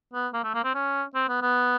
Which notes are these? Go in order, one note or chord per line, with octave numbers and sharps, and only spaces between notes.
B3
A#3
A3
A#3
C4
C#4
C4
B3
B3